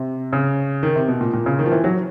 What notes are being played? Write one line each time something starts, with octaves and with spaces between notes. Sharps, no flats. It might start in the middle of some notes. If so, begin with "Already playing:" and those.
Already playing: C3
C#3
D#3
C3
B2
A#2
A#2
C#3
D#3
F3
E3
F#3